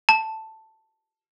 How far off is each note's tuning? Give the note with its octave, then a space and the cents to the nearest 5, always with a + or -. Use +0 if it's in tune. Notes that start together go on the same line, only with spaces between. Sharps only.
A5 +5